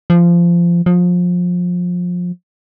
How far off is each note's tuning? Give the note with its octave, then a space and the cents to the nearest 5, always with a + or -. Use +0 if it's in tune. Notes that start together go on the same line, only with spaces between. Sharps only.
F3 -20
F3 +25